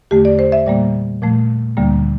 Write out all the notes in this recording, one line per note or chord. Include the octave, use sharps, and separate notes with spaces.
E2 D3 A3 G4
D5
C5
E5
A#2 G3 A#3 D5
A#2 F3 A3
D2 D3 G3 A#3